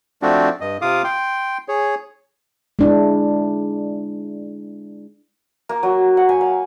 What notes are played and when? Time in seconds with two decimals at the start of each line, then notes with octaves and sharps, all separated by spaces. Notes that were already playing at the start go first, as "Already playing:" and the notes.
0.22 F3 A3 C4 D4 F#4
0.61 G2 D#5
0.82 C3 F4 F5 D6 D#6
1.04 G5 C6
1.68 G#4 C#5
2.79 G#3 D4 E4
5.69 A#3
5.83 F#3
6.17 F#5
6.29 G#5
6.41 F5